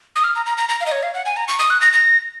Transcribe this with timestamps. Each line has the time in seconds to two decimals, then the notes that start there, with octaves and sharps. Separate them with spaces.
0.16 D#6
0.24 F6
0.36 A#5
0.46 A#5
0.58 A#5
0.69 A#5
0.81 F5
0.86 D#5
0.92 C#5
1.03 F5
1.14 F#5
1.26 G#5
1.36 A#5
1.48 C#6
1.59 D#6
1.70 F#6
1.81 A#6
1.93 A#6